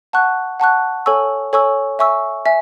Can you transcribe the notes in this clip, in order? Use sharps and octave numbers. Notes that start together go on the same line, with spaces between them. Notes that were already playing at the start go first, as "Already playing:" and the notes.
F#5 A5 C#6 F#6
F#5 A5 C#6 F#6
A4 C#5 G#5 C#6 E6
A4 C#5 G#5 C#6 E6
E5 G#5 C#6 E6
E5 G#5